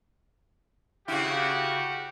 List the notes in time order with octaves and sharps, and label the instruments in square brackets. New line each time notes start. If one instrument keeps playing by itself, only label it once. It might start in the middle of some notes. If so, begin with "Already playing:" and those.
[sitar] C#3 E4 [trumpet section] F#4 G4